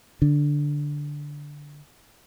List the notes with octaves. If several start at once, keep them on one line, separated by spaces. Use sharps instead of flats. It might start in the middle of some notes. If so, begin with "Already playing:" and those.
D3